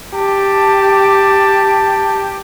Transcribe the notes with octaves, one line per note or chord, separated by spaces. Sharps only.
G4 A5